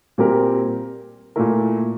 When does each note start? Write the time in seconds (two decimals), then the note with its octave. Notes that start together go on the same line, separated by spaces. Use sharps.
0.18 A#2 G3 C4 G4 A#4
1.36 A#2 A3 E4 A#4